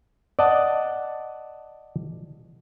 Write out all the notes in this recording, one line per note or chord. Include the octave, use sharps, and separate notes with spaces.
D5 D#5 F#5 A5